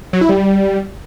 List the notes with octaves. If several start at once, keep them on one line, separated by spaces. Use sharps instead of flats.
F#3
E4
G3